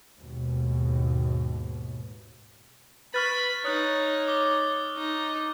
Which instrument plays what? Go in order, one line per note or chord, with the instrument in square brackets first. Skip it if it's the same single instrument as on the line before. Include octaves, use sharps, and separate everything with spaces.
[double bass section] D#2 G#2 B2
[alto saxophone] B4 [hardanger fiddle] B5 [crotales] C#6 F6 A6
[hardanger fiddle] D#4 [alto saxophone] C#5 [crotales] D#6 F#6
[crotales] D6 G7
[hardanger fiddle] D#4